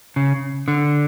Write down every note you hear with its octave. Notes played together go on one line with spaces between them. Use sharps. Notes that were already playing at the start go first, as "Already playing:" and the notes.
C#3
D3